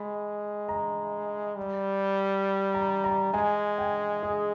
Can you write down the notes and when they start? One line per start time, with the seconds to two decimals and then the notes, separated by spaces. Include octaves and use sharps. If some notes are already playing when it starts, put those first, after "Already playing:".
Already playing: G#3 B5
0.69 A#5
1.56 G3
2.74 A#5
3.04 A#5
3.33 G#3 G#5
3.78 G5
4.23 G#4